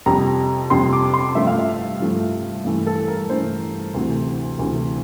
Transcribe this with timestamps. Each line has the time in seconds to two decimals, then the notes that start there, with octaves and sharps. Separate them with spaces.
0.06 F2 C3 G3 A#5
0.70 F2 C3 G3 C6
0.93 D6
1.14 C6
1.35 G2 F3 A3 E5
1.47 F5
1.59 E5
2.00 G2 F3 A3
2.65 G2 E3 A3
2.87 A4
3.08 A#4
3.29 G2 E3 A3 C5
3.94 D2 C3 E3 A3
4.59 D2 C3 E3 A3